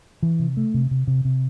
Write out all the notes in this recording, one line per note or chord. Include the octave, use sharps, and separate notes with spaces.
E3
C3
A3
C3
C3
C3
C3